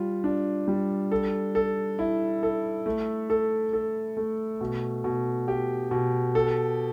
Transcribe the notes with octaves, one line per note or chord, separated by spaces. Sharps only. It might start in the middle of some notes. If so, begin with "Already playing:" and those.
Already playing: G3 F4
D4
G3
A4
A4
E4
A4
A3
A4
A4
A3
B2
B2
G4
B2
A4